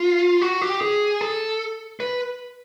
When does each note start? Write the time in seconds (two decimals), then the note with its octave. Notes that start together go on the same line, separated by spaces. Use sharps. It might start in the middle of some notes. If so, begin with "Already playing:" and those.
Already playing: F4
0.41 F#4
0.62 G4
0.81 G#4
1.21 A4
2.00 B4